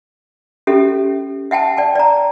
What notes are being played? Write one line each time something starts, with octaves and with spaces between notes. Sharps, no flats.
C#4 G4 A4 E5
E5 F#5 G5 A5
D5 G5 A5
D5 A#5